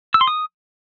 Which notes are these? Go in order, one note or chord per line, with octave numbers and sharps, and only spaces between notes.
E6
C6
D#6